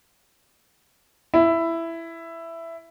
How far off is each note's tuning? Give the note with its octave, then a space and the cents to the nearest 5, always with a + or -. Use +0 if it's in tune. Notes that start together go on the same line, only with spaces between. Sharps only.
E4 +10